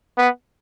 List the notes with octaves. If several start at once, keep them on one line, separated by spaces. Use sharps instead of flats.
B3